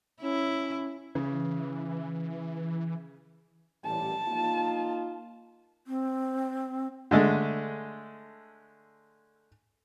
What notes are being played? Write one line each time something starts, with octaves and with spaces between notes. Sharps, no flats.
C#4 E4
C#3 E3
A1 A#2 G3 A5
A#3 D#4 F4
C4
D3 G#3 A3